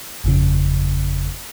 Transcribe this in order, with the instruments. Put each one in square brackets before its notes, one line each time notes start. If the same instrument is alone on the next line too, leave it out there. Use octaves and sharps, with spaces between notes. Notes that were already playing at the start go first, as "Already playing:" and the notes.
[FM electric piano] G1 F2 C#3